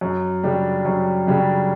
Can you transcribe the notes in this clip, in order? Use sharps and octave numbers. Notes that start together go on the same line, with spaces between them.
F#2
C#3 G3 D4 G4
F#2
C#3 G3 D4 G4